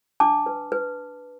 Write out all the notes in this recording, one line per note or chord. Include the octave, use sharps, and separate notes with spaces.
D4 A5 D6
B4
B4